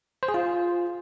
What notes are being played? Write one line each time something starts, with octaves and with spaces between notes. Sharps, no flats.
C5
G#4
F4